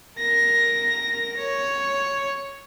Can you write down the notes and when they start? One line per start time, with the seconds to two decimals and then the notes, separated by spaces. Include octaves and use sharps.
0.18 A#4 A#6
1.37 C#5